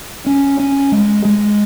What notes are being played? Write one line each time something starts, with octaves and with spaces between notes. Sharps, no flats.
C#4
C#4
G#3
G#3